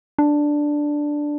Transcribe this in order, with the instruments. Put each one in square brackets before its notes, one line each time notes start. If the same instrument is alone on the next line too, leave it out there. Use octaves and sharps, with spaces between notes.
[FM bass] D4